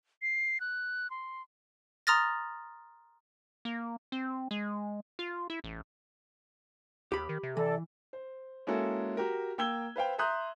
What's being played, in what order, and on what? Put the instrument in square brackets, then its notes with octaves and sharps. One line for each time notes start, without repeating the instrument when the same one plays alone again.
[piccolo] C7
F#6
C6
[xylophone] A#5 C6 D#6 F6 A6 A#6
[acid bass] A#3
C4
G#3
F4
E4
A1
[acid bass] D#2 [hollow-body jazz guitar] G4 B5
[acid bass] D#3
C3
[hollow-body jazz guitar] E3 [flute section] A4 D5
[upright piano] C5
G#3 A#3 C#4 E4 F#4 A4
F#4 G4 A#4
A#3 G5 E6 G#6 G7
B4 C5 F5 G5
E5 A#5 C6 D#6 F#6 G6